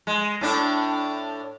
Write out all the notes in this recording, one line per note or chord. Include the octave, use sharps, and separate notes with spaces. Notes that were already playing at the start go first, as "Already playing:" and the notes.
G#3
A2 D4